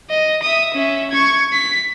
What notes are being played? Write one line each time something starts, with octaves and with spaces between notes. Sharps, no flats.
D#5
E5 D#6
C#4 E5
C#6 G#6
B6